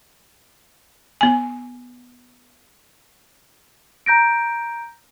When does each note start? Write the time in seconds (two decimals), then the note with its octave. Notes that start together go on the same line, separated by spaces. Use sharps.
1.21 B3 G#5
4.06 A#5 G6 A#6 D7